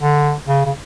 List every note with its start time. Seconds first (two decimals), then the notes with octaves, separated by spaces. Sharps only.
0.01 D3
0.48 C#3
0.66 C#3